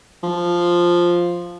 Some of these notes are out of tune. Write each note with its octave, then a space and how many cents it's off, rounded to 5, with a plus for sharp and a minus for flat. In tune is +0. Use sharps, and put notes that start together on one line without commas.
F3 +0